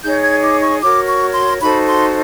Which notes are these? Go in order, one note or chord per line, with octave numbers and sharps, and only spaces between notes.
D#4 G#4 C#5 G6
G#6
D6
C#6
F#4 A#4 C#5 D6
C#6
C6
D#4 F#4 A4 C5 B5
C6